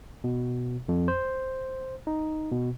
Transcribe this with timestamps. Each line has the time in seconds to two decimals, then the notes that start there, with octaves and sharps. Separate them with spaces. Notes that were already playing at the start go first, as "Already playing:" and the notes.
0.24 B2
0.89 F2
1.08 C5
2.07 D#4
2.52 B2